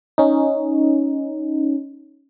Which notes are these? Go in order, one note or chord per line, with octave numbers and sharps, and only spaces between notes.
C#4 D#4